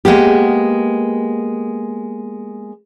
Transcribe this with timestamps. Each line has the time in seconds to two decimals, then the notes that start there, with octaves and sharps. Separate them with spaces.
0.05 G#3 A#3 B3 G4